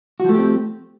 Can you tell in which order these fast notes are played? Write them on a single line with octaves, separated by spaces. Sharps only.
F#4 F3 A3 G4 C4